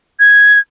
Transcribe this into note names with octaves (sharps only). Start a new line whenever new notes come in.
G#6